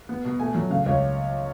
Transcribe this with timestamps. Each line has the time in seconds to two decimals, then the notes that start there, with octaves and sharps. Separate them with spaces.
0.09 B3
0.25 B2
0.40 A3 G#5
0.55 F#3
0.70 C#3 F5
0.86 C#2 C#5